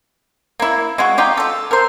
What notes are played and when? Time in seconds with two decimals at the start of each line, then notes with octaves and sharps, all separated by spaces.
0.60 A#3 E4
0.98 G#3 F4 F#4
1.18 D#4 F4 G4
1.37 F4 A4
1.71 A#4 C5